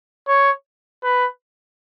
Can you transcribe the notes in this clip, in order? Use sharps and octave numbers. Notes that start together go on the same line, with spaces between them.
C#5
B4